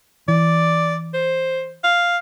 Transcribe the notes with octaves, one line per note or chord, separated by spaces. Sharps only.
E3 D5
C5
F5